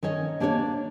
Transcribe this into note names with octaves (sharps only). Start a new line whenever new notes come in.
D#3 C#4 C#5 D#5
A#3 D4 G4 A#4 C#5 D5